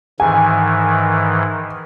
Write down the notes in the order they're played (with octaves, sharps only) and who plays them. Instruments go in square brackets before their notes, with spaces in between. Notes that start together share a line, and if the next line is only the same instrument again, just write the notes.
[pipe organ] G#2 D#3 E3 [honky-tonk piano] G#5